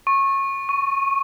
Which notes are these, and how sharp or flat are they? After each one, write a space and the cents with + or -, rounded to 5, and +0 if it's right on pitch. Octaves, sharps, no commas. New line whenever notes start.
C#6 -20
C#6 +10